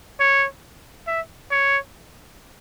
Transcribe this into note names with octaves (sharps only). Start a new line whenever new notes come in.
C#5
E5
C#5